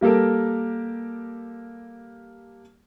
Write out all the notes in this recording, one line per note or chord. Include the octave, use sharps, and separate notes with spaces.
G3 A#3 G4 A4 A#4